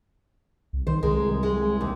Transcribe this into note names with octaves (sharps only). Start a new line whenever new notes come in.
C2
D#3 C5
C2 G#3 A#4
G#3
D#2